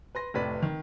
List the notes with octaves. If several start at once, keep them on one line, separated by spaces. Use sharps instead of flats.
B4 C6 A#6
F1 A2 C3 B4 D5 B6
D#3